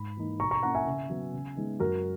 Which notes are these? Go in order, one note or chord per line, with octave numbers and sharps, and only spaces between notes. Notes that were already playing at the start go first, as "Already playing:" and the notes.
Already playing: G#2 B5
E3 A#3 D#4
B2 A#5 C#6
A#5 C#6
A#3 C#4 E4 F#5 A#5
E5 G#5
C#3
F#3 B3
C#3
G#3 B3 D#4
F#2 F#4 A#4